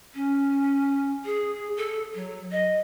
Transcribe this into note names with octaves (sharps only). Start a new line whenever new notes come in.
C#4
G#4
A4
F#3
D#5